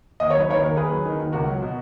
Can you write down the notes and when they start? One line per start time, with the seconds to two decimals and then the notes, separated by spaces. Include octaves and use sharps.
0.20 D#2 D#5
0.30 F#3 C#5
0.40 B4
0.49 D#3 A#4 C#5
0.63 D#2 A#4
0.76 D#2 G#4 B4
0.91 F#3
1.05 D#3
1.20 D#2
1.33 C#2 F#4 A#4
1.48 F#3
1.62 B2